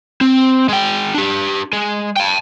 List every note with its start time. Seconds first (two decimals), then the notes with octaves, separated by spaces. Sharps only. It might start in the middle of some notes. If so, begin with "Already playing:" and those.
0.21 C4
0.69 G#3 G5
1.14 D4 G4
1.73 G#3
2.16 G5 A5